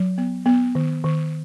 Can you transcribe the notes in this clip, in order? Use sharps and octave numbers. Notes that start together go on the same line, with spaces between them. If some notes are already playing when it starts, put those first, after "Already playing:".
Already playing: F#3
B3
B3
D#3
D#3